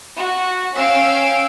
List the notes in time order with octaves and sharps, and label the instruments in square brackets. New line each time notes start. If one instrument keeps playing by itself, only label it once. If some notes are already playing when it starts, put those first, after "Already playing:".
[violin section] F#4
C#4 F5 G5 E6 D7